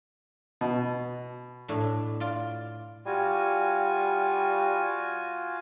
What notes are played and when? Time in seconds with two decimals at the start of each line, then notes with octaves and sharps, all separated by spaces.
0.61 B2
1.68 A2 D4
2.20 F4 D5
3.06 G3 F4 F#4 G#5